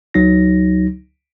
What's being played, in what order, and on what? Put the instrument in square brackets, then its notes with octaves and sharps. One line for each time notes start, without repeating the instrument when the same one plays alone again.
[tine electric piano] C#2 F#3 D#4 A#6